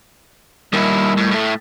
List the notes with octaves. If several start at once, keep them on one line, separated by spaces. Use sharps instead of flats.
D#2 G3 E4 A#4 D#5
A2
A2 A3